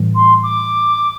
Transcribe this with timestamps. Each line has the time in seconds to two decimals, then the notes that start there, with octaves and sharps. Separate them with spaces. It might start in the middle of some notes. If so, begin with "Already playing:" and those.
Already playing: A2 E3 G3
0.15 C6
0.43 D6